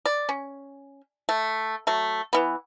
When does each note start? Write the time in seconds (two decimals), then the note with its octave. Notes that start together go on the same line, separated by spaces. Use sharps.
0.06 D5
0.29 C#4
1.29 A3
1.87 F#3 A3
2.33 E3 B3